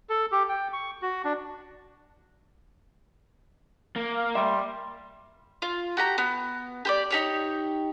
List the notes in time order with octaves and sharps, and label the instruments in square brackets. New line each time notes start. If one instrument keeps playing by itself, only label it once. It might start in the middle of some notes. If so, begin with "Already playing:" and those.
[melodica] A4
G4
G5
C#6
F#4
D4
[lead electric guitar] A#3
[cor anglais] F5
[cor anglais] G3 [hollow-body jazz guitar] E5 [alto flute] C6
[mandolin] F4
F#4 G4 A#5
B3
G4 C5 D5
D#4 G4 C#5